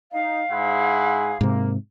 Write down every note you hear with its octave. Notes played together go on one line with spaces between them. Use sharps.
D#4 F5
G#2 E4 F4 G#4 F#5
G#2 C3 A#3